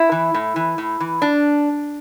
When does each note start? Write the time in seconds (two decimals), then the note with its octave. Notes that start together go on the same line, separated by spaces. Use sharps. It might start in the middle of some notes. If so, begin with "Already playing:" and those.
Already playing: E4
0.12 E3
0.34 A2
0.56 E3
0.78 A2
1.00 E3
1.22 D4